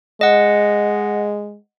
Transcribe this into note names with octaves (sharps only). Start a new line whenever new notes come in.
G#3 D#5 F#5